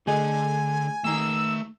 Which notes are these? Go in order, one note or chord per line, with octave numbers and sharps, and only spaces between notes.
D3 A3 G#4 D#5 G#5
D#2 D#3 A3 A#5 E6